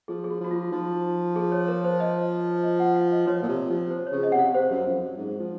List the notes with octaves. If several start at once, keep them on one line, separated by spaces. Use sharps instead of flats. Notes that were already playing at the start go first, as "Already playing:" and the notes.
F3 G#4
G#4
F#4
F3 F#4
F4
F3 D#4
G#4
C#5
A#4
C5
D#5
D#5
F#5
F5
D#5
F3 C#5
A#2
C3
F3
C5
C#5
C#3
D#5
C3 F#5
F5
C3 C5
F#2
F2
F#2
G#2
F3